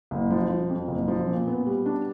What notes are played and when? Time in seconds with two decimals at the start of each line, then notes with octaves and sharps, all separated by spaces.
0.11 F#1
0.30 F3
0.50 F3
0.70 F2
0.88 F#1
1.08 F3
1.27 A#2
1.47 B3
1.66 G3
1.86 D4